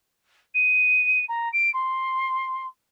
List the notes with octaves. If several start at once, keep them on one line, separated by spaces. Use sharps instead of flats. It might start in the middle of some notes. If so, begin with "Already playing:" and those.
D#7
A#5
D7
C6